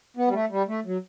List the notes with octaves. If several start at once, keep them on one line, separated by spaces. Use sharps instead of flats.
B3
G3
A3
G3
A3
F#3